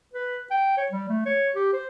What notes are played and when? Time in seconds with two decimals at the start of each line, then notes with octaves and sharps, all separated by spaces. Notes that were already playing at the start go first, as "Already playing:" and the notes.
0.14 B4
0.51 G5
0.77 C#5
0.92 G3
1.09 A3
1.26 C#5
1.56 G4
1.73 C5